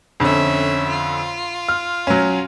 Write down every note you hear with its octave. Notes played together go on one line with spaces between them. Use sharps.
F2 D3 C#4 E5
F4
F6
F#3 C#4